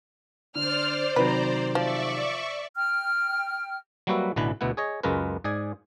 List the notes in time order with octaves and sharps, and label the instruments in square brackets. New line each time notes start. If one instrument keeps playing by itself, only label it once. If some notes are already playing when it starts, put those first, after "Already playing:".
[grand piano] D3 [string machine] C5 D5 [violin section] F6
[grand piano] C3 D#3 F#3 [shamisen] B4 [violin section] A#5
[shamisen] F3 [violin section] D5 [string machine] E5 C#6
[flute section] G5 F6
[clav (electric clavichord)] F#3 G3 A#3 F#4 B4 E5
A1 B2 D3 E3 B4
D2 B2 B3 E4 F#5
G#4 C#5 D#5
C#2 F#2 G#3 F4 A#4 B4
G#2 G#4 D5 G#5